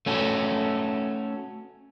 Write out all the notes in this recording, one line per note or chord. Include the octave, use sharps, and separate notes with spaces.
A3 C#4 F#4 A4